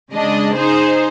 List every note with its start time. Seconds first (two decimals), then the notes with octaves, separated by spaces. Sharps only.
0.11 C#3 G#3 D4 D#5
0.55 D#4 G#4 C5